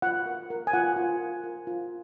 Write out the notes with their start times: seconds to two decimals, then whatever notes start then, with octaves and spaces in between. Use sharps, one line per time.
0.02 F4 F#5
0.26 A#4
0.50 A#4
0.67 G#5
0.73 F4 F#5
0.96 F4
1.20 A#4
1.44 A#4
1.67 F4